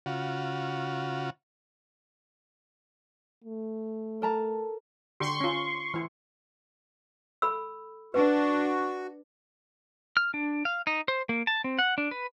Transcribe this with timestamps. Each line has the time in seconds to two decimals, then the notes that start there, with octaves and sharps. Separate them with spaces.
0.06 C#3 F4 F#4
3.45 A3
4.22 A4 A#4 A5 A#5
5.20 D3 G4 C6 C#6
5.41 C#4 F4
5.94 E3 E4
7.42 A4 B5 E6
8.14 D4 F#4 B4
10.17 F6
10.34 D4
10.65 F5
10.87 D#4
11.08 C5
11.29 A#3
11.47 A5
11.64 C4
11.79 F#5
11.98 D4
12.11 B4